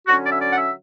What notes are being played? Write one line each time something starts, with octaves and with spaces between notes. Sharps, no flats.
D3 F#3 C#4 F#4
D5
E5
D5
F#5
E5